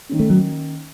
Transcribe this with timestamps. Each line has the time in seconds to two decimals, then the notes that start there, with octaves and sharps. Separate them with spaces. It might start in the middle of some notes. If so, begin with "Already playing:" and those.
0.09 D#3 A#3 C#4
0.20 A3
0.30 F#3